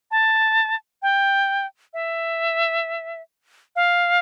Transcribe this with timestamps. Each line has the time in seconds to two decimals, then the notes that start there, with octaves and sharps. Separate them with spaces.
0.11 A5
1.02 G5
1.94 E5
3.76 F5